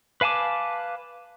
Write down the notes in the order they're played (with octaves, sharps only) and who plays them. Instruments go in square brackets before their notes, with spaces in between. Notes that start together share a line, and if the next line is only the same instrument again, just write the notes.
[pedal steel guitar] B4 F5 G#5 A5 D6